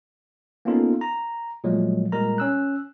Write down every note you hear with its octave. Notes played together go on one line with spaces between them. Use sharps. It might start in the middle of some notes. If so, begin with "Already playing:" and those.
A#3 B3 C#4 D#4 F4 A4
A#5
A#2 F3 F#3 G#3 A3
A#2 G3 G#3 A#4 A#5
C#4 E6 F#6